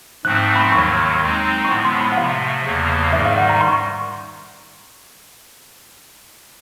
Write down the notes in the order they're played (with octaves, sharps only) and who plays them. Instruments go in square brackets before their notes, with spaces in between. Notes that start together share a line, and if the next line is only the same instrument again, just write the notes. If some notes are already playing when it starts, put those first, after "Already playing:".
[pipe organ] G#2 F3 A3 C4 [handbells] F#6
[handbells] B5
C6
[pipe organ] D#2 D#3 F#3 [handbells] C#6
[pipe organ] G#3 C4 D#4
[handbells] C#6
[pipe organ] A2 F3 G#3 B3 [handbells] C6
[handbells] C6
B5
F#5
[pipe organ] C3 F3 A3 [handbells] F5
[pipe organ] E2 C#3 F3 A#3
[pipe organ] G#2 D#3 G3 [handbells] E5
[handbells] F5
F#5
A#5
C6
C#6